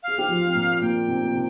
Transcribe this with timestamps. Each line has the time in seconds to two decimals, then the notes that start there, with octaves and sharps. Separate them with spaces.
0.03 G#4 F5
0.18 G4
0.29 F3 F4
0.46 C4
0.55 A#2 A#3
0.81 A#2 A#3 G5
1.08 C3 C4
1.24 A#3
1.34 C3 C4